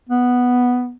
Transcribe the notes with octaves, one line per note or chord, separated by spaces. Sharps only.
B3